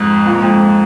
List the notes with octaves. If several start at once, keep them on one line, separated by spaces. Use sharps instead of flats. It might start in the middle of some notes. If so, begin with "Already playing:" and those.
Already playing: F2 G#2
A#2
G#2
F2
G#2